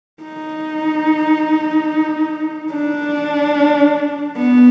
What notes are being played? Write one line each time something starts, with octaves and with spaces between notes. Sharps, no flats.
D#4
D4
B3